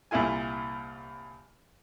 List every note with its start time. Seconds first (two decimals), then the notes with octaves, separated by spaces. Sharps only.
0.11 C2 A#2 E4 F4 G#5